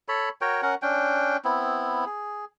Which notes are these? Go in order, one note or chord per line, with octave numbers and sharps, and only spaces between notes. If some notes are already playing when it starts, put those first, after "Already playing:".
A4 C#5 B5
F#4 A#4 C#5 G5
C#4 A#4 F#5
C#4 D4 G5
B3 C4 E4
G#4